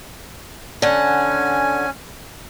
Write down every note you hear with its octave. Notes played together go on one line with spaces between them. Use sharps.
D3 C#4 F#5 G#5